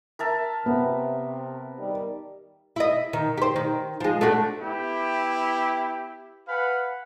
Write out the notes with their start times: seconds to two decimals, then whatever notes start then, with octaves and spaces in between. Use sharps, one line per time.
0.19 A#4 E5 A5
0.66 C3 B3
1.78 D#3 G3
2.76 E4 D#5
3.13 D#3
3.37 G4 C5
3.56 D#3
4.00 F3 G#3
4.21 A3 D4 F#4
4.61 B3 E4 G4
6.48 B4 F5 F#5 G#5 B5